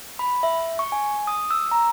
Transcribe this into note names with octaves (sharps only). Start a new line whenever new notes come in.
B5
E5
C#6
G#5
D#6
E6
A#5